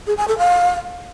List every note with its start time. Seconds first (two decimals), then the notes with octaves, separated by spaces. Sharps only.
0.07 G#4
0.18 G#5
0.28 A4
0.38 F5